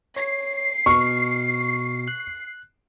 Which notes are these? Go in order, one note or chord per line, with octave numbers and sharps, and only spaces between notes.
C#5 C7
B2 C#6 F6
F#6